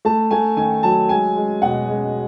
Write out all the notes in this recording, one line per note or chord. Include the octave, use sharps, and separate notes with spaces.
A3 A5
A3 G#5
D#3 G#5
F#3 A5
G#3 G#5
G#3
B2 F#5
G#3